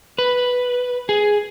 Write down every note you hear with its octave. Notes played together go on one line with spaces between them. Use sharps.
B4
G#4